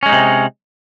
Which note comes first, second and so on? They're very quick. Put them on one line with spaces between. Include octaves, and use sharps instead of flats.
C#4 G#3 D#4 C3